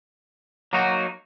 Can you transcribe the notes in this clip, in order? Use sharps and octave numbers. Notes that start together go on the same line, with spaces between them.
F#3 A#3 D#4 F#4